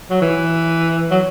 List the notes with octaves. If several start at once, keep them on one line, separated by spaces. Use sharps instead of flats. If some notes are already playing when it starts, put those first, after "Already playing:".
F#3
E3
F#3